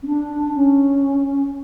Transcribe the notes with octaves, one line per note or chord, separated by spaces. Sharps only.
C#4
D4
C#4